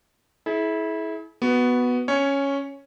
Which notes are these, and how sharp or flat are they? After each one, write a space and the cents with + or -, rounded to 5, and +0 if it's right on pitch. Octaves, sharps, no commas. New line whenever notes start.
E4 -20 G#4 +40
B3 +0 F#4 +0
C#4 +0 C#5 +0